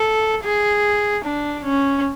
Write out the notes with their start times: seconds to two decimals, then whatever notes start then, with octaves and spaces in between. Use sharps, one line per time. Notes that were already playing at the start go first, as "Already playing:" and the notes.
Already playing: A4
0.43 G#4
1.24 D4
1.64 C#4